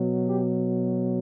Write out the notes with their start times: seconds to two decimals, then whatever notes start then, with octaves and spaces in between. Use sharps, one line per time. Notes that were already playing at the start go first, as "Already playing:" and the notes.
Already playing: B2 F#3
0.26 G4